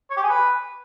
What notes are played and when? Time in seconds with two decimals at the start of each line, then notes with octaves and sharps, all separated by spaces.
0.10 C#5
0.17 G4
0.23 G#4
0.29 B4